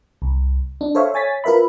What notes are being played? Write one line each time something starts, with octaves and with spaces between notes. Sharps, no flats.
C2
D4
A4 C5 C#5 E5 F5
C#5 G#5 A6 B6
F4 A#4 B4 E5 B5